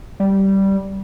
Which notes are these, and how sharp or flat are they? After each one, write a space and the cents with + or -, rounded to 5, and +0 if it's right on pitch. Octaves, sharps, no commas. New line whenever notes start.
G3 -10